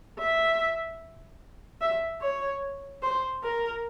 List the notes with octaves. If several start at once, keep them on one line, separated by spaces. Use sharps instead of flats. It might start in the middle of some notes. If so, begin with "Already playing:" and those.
E5
E5
C#5
C5
A#4